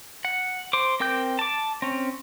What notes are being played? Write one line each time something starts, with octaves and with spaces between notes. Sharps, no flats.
F#5
C5 D6
C4 A#4 G5 D6 G6
A5 D6
C4 C#4